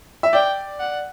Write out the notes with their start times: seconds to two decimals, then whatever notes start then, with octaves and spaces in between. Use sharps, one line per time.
0.23 E5
0.33 D5 G5
0.80 F#5